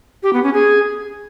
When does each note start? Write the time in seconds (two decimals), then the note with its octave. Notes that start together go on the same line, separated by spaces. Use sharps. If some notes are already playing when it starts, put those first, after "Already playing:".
0.23 G4
0.33 B3
0.43 C#4
0.54 G#4